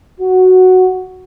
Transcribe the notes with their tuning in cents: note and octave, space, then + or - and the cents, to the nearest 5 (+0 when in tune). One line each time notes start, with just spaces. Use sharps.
F#4 +0